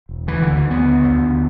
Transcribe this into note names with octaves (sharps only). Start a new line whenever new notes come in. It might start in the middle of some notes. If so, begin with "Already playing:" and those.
E1
D2 E3
D2 D3
E3
D3 B3
D3
D2
D3